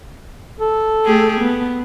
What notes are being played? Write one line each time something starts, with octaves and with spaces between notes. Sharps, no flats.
A4
A3 G4 G#4
B3